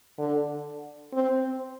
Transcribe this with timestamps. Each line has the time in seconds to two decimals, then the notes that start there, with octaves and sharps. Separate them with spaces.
0.18 D3
1.13 C4